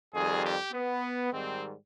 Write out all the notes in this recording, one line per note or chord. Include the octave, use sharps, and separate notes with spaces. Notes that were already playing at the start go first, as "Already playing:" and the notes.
F2 D#3 G3 G#4
G4
B3
G#2 D#3 G3 C4